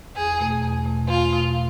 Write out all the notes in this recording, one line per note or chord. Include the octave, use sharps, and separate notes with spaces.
E2 G#4
B2 A3
E2
B2 A3
E2 F4
B2 A3